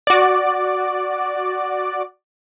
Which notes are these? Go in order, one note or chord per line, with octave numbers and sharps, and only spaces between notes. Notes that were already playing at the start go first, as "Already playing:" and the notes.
F#4 D5